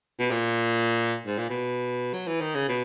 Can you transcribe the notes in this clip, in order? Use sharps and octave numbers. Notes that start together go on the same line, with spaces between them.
B2
A#2
G#2
A#2
B2
F#3
E3
D#3
C#3
B2